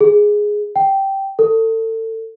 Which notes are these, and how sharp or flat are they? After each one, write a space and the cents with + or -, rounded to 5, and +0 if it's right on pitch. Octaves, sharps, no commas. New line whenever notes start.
G#4 +0
G5 -10
A4 +30